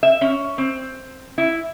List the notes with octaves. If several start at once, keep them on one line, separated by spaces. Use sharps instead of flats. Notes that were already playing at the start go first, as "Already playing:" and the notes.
E5
C#4
C4
E4